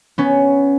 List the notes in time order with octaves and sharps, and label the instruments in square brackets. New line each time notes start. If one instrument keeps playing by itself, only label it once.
[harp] B3 C#4